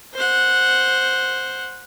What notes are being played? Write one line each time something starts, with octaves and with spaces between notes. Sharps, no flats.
C5 F#5